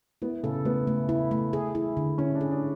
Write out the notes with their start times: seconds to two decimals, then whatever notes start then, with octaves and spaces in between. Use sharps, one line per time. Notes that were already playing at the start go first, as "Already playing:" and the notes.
0.22 B3 E4
0.43 C#3 A4
0.65 A3 B3
0.87 A3
1.09 E4
1.31 A3
1.53 G#4
1.75 E4
1.97 D3
2.18 C#4 E4
2.35 D4
2.41 G#4
2.51 D4